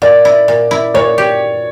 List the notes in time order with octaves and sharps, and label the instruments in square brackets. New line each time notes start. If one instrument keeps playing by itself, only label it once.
[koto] A#2 [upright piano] D5
[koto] E4
A#2
E4
[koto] A#2 [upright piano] C#5
[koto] G4